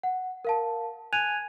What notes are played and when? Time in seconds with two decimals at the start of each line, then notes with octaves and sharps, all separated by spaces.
0.03 F#5
0.45 A#4 F5 A5
1.13 G#5 F#6 G#6 D#7 F7